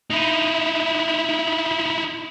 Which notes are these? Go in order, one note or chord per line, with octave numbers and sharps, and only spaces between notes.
D#4 E4